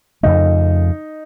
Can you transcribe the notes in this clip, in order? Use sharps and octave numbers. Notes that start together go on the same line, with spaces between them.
F2 C#3 A3 D#4